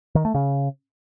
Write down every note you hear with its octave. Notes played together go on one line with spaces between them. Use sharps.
D#3
A3
C#3